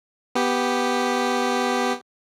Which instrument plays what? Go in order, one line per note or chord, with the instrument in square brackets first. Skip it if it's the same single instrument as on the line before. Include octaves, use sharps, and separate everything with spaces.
[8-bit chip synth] B3 G4